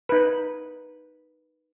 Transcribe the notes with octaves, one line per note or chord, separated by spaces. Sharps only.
D#4 B4